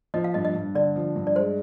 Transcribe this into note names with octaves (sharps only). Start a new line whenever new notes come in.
F3 D#5
F5
G2 D#5
D#5
G2
D3 D5
F3
G2
D5
G#3 C5